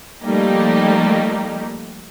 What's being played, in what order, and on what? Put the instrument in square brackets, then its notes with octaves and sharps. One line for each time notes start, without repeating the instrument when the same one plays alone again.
[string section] F3 G3 A3 A#3 D#4 G4